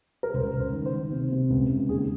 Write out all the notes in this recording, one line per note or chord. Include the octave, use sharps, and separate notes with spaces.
A#4
C#2 C5
C#2
C5
D#3
C5
D#3
C3
C3
C#2
C#2
D#2 G#4